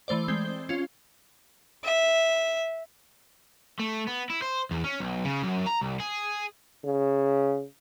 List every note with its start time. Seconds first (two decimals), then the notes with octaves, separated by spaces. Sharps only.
0.08 E3 A3 C5 D5
0.28 G#3 C4 G7
0.69 C#4 F4
1.84 E5
3.79 A3
4.07 B3
4.30 E4
4.42 C5
4.71 E2
4.84 C#4
5.00 B1
5.24 C#3
5.43 F#2
5.67 A#5
5.82 C2
6.00 G#4
6.85 C#3